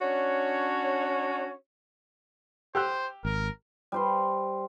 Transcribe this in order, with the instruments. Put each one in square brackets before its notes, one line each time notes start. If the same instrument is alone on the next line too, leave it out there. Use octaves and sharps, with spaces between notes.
[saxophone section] C#4 D4 F#4 C#5
[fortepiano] G4 E6 F#6 [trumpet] C5
[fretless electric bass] G#1 [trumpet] A#4
[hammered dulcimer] G3 C5 C6